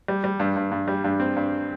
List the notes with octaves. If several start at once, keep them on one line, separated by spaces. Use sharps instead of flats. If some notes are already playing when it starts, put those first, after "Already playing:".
G3
G3
G2
G2
G2
G3
G2
C4
G2